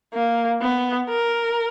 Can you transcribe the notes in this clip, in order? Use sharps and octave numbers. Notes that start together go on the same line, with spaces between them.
A#3
B3
A#4